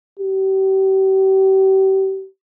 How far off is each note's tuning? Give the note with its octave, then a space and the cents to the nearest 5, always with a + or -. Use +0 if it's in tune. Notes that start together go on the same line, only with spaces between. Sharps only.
G4 -35